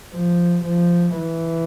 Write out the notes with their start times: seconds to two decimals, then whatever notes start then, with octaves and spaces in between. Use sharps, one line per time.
0.13 F3
0.65 F3
1.17 E3